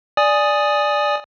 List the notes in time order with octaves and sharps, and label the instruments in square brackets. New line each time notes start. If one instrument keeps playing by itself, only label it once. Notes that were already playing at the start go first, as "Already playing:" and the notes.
[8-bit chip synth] D5 G#5 D#6